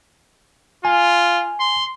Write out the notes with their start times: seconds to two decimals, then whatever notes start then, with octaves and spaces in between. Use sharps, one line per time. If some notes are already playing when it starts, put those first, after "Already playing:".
0.85 F4 G#5
1.60 C6